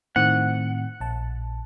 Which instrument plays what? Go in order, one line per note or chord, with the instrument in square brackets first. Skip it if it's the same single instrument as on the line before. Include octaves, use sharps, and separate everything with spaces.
[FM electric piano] A2 D#3 C4 [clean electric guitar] F#5
[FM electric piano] A#1 A5